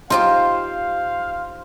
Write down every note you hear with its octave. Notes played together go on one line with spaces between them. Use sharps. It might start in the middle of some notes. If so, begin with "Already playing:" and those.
D#4 F4 G4 C5 F5